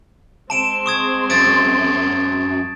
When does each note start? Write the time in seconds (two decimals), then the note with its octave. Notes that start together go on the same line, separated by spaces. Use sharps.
0.50 G#3 C4 A5 C6 D7 E7
0.86 C#6 D#6 G#6
1.30 F#2 A6 D7